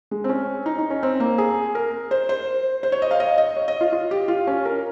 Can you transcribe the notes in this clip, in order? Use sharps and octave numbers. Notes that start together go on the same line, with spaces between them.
G#3
C4
C#4
D#4
D#4
C#4
C4
A#3
G#4
A#4
C5
C5
C5
C#5
D#5
F5
D#5
D#5
C#5
D#5
F4
F4
G4
F4
C#4
A#4